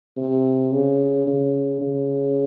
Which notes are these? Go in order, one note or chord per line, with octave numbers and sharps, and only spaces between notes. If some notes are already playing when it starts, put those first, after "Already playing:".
C3
C#3
C#3
C#3